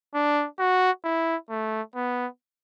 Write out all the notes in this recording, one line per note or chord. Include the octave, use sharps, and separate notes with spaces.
D4
F#4
E4
A3
B3